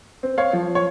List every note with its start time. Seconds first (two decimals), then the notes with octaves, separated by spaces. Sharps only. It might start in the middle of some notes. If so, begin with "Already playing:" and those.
0.23 C4
0.38 C#5 F5
0.53 F3
0.75 C#5